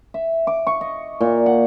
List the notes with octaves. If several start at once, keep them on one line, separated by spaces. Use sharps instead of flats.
E5
D6
C#6
D#5
A#2
F#5